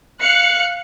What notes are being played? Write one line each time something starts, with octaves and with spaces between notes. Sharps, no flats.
F5 F#6 C#7